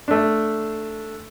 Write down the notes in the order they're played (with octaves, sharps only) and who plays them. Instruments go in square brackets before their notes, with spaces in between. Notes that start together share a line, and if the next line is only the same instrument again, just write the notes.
[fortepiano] A3 D4